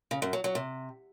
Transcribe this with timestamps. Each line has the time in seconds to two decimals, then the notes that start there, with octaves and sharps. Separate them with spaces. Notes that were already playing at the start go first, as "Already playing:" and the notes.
0.11 C#3
0.22 F#2
0.33 F#3
0.44 F#3
0.55 C3